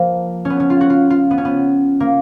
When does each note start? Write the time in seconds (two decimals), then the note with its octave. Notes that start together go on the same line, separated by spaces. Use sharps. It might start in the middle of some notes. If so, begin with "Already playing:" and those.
Already playing: F3 A#3
0.45 B3 C#4
0.60 C#4
0.70 F4
0.81 F#4
0.90 F4
1.10 F4
1.31 B3
1.38 C#4
1.45 B3
2.00 A#3